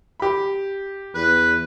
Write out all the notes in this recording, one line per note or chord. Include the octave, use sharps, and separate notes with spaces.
G4 B5
E2 B4